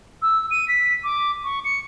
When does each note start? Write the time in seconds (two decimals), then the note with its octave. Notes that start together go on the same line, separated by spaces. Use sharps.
0.22 E6
0.51 D#7
0.68 B6
1.04 D6
1.44 C#6
1.65 C#7